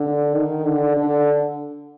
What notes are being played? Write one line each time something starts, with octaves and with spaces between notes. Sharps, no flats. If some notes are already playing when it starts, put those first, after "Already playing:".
Already playing: D3
D#3
D3
D3